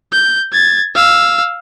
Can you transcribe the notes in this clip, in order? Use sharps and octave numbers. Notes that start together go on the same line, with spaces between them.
G6
G#6 A6
F5 E6